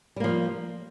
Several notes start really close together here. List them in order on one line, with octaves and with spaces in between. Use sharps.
G3 A#3 F3